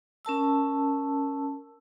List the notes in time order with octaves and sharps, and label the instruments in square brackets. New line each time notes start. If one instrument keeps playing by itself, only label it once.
[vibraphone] C#4 A#4 A5 E6